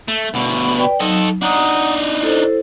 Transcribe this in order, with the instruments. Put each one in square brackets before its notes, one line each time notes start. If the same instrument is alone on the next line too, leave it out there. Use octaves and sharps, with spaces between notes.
[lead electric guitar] A3
D2 B2
[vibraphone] B4 D5 G5
[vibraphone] F#3 D#4 [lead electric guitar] A4 D#5
[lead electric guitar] D4 D#4 [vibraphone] F#5 A#5 D#6
[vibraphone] E4 A4 C5